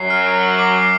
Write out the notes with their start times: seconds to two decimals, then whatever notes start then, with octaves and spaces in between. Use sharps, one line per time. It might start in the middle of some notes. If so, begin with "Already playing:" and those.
Already playing: F#2 F#3 C7
0.10 F6
0.26 D7
0.43 F#7
0.59 D6
0.75 C7